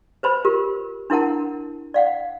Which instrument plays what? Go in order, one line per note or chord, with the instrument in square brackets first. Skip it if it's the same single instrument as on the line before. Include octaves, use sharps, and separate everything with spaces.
[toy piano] B4 C5 B5
F4 G4 A#4
D4 E4 A#4 F#5 A5
D5 F5 F#5